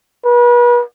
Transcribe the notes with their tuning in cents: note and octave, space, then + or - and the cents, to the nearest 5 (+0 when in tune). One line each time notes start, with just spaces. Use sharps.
B4 -35